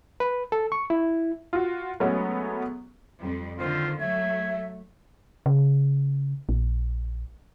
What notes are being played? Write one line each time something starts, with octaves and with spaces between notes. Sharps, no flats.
B4
A4
C#6
E4
F4 F#4
F#3 G#3 A3 B3 C#4
F2 G3
D3 D#3 F4 C5
F#3 A3 E5 G#6
C#3
A#1